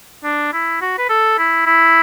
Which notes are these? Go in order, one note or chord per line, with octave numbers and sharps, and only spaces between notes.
D4
E4
F#4
B4
A4
E4
E4